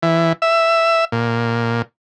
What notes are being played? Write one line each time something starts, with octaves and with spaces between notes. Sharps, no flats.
E3
E5
A#2